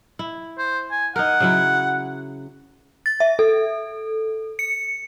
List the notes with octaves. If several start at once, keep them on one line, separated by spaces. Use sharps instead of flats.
E4
C5
G#5
D#4 A#4 F#5
C#3 F#3 E4
A6
E5
A4
C#7